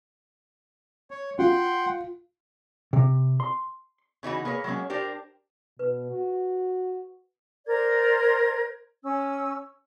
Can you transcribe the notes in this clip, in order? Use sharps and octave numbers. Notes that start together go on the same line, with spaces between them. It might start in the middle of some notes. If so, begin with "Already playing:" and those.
C#5
F4 F#5 G5 C6
C3
C6
C#3 E3 D#4 F#4
A#3 G#4 B4 C#5
F#3 G#3 A#3 C#4
D4 G4 A#4 C5
B2 B4
F#4
A#4 C5 D5 G#6
C#4 E6